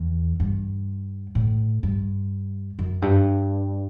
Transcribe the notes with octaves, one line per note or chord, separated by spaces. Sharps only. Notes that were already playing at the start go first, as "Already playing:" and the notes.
Already playing: E2
G2
A2
G2
F#2
G2